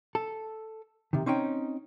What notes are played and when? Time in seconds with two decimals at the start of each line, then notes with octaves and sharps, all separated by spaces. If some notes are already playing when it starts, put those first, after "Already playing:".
0.15 A4
1.13 C3 D#3
1.26 C4 C#4 D#4 C#5 G5